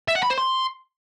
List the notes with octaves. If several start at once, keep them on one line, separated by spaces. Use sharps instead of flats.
E5
F#5
B5
C5
C6